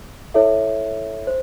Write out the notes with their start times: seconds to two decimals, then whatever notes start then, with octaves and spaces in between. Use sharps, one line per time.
0.34 E4 A4 C#5 E5
1.27 C5